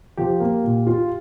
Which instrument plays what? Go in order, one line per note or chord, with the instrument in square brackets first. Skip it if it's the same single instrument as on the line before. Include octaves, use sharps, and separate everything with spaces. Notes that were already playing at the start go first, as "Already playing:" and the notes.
[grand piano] F3 [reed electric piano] G4
[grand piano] A#3
A#2
F4